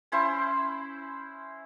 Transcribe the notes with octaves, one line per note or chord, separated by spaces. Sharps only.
C#4 E4 C5